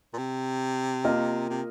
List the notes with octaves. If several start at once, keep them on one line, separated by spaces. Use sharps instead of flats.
A#2
C3
A#3 F4 A#4 D#5
C3